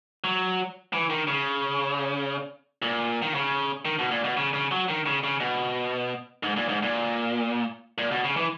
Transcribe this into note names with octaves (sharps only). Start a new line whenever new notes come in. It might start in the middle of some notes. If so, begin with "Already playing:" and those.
F#3
E3
D#3
C#3
A#2
D#3
C#3
D#3
B2
A#2
B2
C#3
C#3
F#3
D#3
C#3
C#3
B2
G#2
A#2
G#2
A#2
A#2
B2
C#3
E3